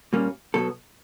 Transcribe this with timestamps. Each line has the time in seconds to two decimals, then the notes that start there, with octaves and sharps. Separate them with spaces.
0.13 A#2 G3 A#3 C#4
0.54 B2 F#3 B3 A4